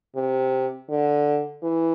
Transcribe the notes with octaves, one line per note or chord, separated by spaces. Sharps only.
C3
D3
E3